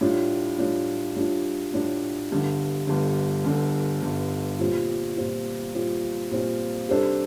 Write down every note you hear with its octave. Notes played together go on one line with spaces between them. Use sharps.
A2 G3 D4 F4
A2 G3 D4 F4
A2 G3 D4 F4
A2 G3 D4 F4
G1 G2 D3
G1 G2 D3
G1 G2 D3
G1 G2 D3
A#2 G3 C4 F4
A#2 G3 C4 F4
A#2 G3 C4 F4
A#2 G3 C4 F4
C3 G3 D4 A4 C5